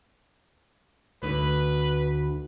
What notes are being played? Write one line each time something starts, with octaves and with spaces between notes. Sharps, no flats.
D2 B4